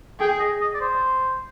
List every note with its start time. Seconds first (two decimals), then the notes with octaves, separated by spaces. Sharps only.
0.20 G#4 G5
0.39 D#5
0.61 D#5
0.74 D5
0.80 C5